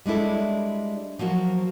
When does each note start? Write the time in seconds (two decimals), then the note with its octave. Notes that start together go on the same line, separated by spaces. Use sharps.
0.06 G3 G#3 D4 E4 A4
1.19 F3 F#3 A#3 F#4